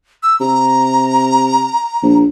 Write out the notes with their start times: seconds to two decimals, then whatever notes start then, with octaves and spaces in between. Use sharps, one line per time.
0.23 E6
0.40 C3 A#5
2.03 A#1